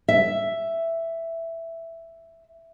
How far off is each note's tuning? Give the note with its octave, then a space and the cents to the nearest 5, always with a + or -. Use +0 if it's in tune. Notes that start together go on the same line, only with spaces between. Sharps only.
E5 +5